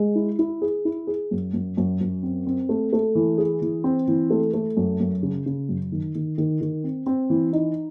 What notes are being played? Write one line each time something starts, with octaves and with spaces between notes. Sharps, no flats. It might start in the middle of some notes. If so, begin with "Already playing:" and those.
Already playing: G#3
E4
E4
G#4
E4
G#4
F#2
F#2
F#2
F#2
C4
C4
A3
A3
E3
G#4
E3
C4
E3
A3
A3
F#2
F#2
C#3
C#3
F#2
D#3
D#3
D#3
D#3
C4
C4
E3
D#4